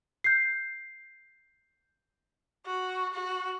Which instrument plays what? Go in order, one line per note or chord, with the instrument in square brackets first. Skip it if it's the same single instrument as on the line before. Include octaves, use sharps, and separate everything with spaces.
[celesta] G6 C7
[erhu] F#4
F#4